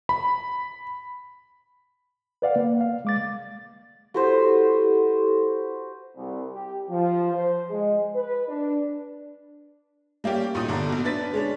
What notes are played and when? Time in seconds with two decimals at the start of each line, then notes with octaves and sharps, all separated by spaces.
0.09 B5
2.42 B4 D5 F5 F#5
2.56 A#3
2.81 F5
3.05 G#3 D6 A6
4.14 E4 F#4 G4 A4 B4 C5
6.16 C2
6.53 G4
6.90 F3
7.33 C5
7.70 G#3
8.15 B4
8.48 D4
10.24 G3 A#3 C#4 G4
10.55 D2 A#2 D#4 D#6
10.68 G1 D3 A#5
10.89 A#1 B2
11.04 D4 B4 A6 B6
11.34 G#3 C#4 D4